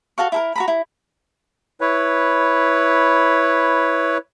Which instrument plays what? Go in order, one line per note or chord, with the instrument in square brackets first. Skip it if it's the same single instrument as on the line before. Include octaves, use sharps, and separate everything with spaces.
[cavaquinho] F#4 A4 F5 C#6
E4 A4 A#4
F#4 A#5 B5
E4
[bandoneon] E4 B4 C#5